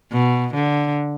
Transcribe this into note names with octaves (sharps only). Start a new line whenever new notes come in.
B2
D3